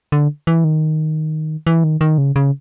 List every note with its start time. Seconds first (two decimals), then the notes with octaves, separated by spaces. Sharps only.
0.12 D3
0.47 E3
0.64 D#3
1.67 E3
1.84 D#3
2.01 D#3
2.18 C#3
2.36 C#3